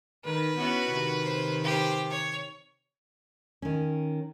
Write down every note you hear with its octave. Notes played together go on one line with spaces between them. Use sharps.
D#3 B4
B3 C#4 E4 F#4
C3 D#3
C5
G4 C5
C#5
D#3 C#4